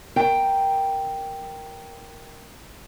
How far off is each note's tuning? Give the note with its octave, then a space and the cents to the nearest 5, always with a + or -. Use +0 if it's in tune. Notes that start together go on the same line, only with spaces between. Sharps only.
A#4 +0 G5 +0